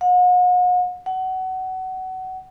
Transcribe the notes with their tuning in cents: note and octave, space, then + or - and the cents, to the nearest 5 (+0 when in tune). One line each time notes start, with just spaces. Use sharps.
F#5 -40
F#5 +20